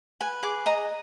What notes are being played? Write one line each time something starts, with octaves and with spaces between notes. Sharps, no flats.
B4 G#5
G#4 D6
D#5 A#5